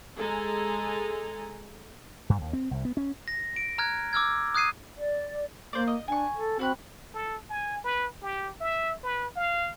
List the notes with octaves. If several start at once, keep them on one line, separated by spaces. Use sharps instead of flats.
G#3 A4 G#5 A#5
G2
D#2
C4
C2
B3
C#4
A#6
D7
A#5 F6 F#6 G#6
D6 E6 F6 G#6
D#6 F#6 G#6 C7 D#7
D5
A#3 C5 D5
D#5
D4 G#5 C#6
A4
C4 F#4 B5 F#6
A4
G#5
B4
G4
E5
B4
F5